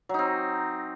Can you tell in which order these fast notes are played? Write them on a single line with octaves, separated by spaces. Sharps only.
F#3 D#4 C4